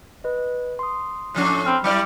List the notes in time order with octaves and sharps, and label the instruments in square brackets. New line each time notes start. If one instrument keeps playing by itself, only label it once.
[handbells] B4 D#5
C6 D#6
[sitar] A2 F3 C#4 [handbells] F#6 C7
[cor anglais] C4 [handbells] B5 F6
[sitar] F#3 E4 D5 [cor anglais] G3 [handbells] C#7